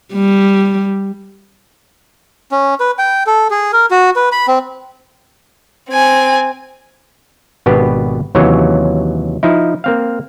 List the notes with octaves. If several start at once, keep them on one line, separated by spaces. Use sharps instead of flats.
G3
C#4
B4
G5
A4
G#4
A#4
F#4
B4
B5
C4
C4 G#5
G#1 B2 B3 D4 G4 B4
D#2 C3 E3 F#3 C#4 C#5
F3 D#4 E4
A#3 C4 F5